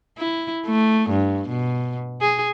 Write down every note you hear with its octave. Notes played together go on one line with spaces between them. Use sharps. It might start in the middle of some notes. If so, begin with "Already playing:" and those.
E4
A3
G2
B2
G#4